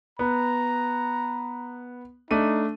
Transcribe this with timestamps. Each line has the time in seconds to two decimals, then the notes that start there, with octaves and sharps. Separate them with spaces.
0.19 B3 A#5
2.31 A3 D4 D#4 D#7